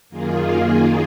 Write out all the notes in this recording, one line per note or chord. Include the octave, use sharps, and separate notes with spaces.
F#2 D#3 A#3 F4 G#4